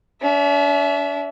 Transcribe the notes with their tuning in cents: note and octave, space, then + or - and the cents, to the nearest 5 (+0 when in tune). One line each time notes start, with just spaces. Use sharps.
D4 -45 E5 +0